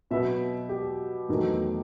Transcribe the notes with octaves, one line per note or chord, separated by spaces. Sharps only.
B2 F#3 B3 E5
G4
E2 D#3 F#3 A3